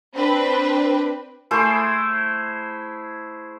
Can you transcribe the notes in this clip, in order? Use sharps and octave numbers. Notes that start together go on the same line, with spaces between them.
C4 D4 B4
A3 E4 G#4 C5